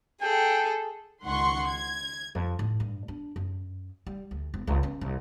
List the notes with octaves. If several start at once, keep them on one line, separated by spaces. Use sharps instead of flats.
G#4 A4 G5
C#2 D#3 F#5 C6 C#6
G#6
F2
A2
G2
D4
F#2
G3
D2
E1
C#2
C#4
C2